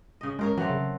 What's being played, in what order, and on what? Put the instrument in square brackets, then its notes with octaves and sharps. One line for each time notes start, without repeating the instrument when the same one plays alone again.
[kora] C#3 D#5
[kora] C#3 A#4 C#5 [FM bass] G#3
[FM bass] E3 [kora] F#3 A3 C4
[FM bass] C#3